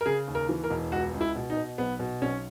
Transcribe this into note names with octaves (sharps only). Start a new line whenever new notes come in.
A#4
C#3 G#4
D#2
A#4
E3
A#4
E1
C#2 F#4
C#2
E4
B2
D#4
B2
B1 B3
B2
B1 C#4